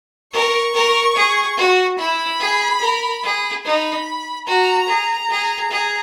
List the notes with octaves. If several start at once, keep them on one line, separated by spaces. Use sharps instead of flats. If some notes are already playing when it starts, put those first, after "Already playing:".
A#4 C#6
A#4
G#4
F#4
E4 B5
G#4
A#4
G#4
D#4 B5
F#4 A#5
G#4
G#4
G#4